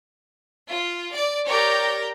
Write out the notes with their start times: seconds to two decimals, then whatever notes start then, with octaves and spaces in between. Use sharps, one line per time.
0.67 F4
1.13 D5
1.46 G4 A#4 C#5 D5 G5